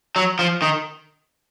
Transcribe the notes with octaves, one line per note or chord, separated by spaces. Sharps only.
F#3
F3
D#3